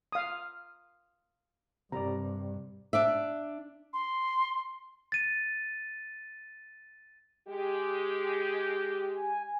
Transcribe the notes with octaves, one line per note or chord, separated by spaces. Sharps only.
F5 D#6
G2 C3 G3 D5 A#5
D4 D5 E5
C6
A6 D#7
G#3 G4
G#5